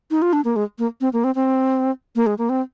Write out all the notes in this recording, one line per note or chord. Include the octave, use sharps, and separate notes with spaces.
D#4
F4
D4
A#3
G#3
A#3
C4
A#3
C4
C4
A#3
G#3
A#3
C4